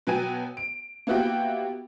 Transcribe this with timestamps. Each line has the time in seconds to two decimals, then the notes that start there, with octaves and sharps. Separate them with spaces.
0.07 B2 F#3 B3 G5 G#5 D#7
0.57 D7
1.07 A#3 B3 E4 F#4 G4 G5